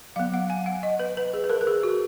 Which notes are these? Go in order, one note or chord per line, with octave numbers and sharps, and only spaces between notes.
F#3 B3 F5
F#5
G#5
F#5
D#5
B4
B4
G#4
B4
A#4
A#4
G#4
F#4